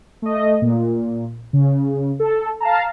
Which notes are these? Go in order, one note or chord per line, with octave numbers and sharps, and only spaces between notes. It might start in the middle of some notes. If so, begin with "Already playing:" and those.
A3 D#5
A#2
C#3
A4
F5 A5 A#5